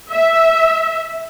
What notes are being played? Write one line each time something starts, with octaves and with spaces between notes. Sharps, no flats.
E5